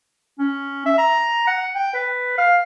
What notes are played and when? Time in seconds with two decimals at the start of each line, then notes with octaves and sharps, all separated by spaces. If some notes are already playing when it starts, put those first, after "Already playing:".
0.39 C#4
0.86 E5
0.98 A#5
1.47 F#5
1.75 G5
1.94 B4
2.38 F5